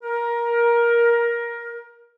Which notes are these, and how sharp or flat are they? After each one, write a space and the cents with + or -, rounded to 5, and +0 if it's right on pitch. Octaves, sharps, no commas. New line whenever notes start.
A#4 +15